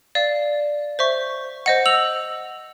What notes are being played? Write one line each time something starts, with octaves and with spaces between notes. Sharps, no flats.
D5 F5
C5 E5 C#6
C5 D#5 F#5
E6 F7 F#7